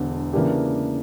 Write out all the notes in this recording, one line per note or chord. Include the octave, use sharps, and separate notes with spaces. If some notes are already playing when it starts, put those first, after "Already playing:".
Already playing: E1 E2 D3
C#3 E3 A#3 D4 G4